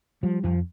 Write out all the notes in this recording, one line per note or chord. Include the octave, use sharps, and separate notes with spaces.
F3 G3
F2 F3